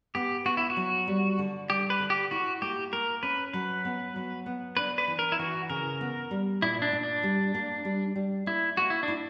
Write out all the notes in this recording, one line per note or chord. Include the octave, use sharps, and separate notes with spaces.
B3 G4
B3 F#4
E4
F#4
F#3
G3
D3
G3 G4
B4
D3
G4
E4 F#4
A#3 G4
A#3 A#4
C#4 B4
F#3 B4
B3
F#3
B3
D4 B4
B4
E3
A#4
E4
E3 F#4
C#3 A#4
B3
G3
A#2 E4
D4
A#2
D4
G3
A#3
G3
G3
A#3 E4
A#3 F#4
E4
D4
E4